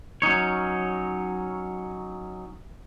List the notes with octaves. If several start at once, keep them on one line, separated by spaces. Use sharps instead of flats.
F#3 C#4 D#4 C#5